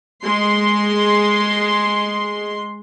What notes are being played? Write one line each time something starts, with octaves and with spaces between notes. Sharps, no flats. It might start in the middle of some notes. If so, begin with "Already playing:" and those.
G#3 C6